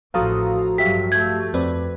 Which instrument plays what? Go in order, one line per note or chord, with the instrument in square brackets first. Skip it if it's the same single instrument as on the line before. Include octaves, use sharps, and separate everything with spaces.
[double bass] A1 [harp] F3 F#4 A4 [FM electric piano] F5 A#5 D#6
[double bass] G2 F#3 [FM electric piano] G4 E5 F5 [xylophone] B6
[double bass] A3 [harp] G6 [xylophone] G#6
[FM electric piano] F2 C4 D5 [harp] B4